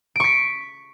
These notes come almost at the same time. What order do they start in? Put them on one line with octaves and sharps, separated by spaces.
D7 C#6 B6